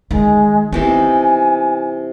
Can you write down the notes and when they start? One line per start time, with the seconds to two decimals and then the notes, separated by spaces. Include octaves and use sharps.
0.11 D#3 G#3
0.72 C3 E3 B3 D#4 G#5